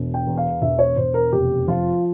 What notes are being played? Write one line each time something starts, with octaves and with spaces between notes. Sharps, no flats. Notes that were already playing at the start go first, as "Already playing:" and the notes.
Already playing: E1
G5
E2
F5
E1 E5
C#5
E1 C5
A#4
F1 G4
F3 F4